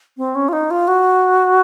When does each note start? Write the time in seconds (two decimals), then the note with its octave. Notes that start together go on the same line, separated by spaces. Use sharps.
0.17 C4
0.35 C#4
0.49 F4
0.53 D#4
0.71 F4
0.88 F#4